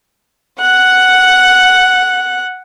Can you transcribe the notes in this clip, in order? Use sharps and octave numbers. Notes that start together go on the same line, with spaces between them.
F#5 F#6